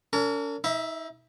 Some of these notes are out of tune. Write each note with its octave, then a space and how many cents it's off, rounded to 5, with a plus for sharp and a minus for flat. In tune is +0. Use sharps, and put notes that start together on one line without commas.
C#4 +45 A#4 -40
D#4 +40 E5 +0